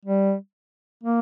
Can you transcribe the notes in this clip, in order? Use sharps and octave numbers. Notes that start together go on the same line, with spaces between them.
G3
A#3